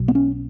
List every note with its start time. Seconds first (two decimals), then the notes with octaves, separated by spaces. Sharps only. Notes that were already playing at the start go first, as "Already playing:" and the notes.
Already playing: B1 B2
0.08 B3
0.15 C#4